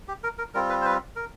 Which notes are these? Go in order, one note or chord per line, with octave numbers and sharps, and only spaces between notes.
G4
A#4
A#4
G3 C4 F4 A#4
B4
C5
B4
A#4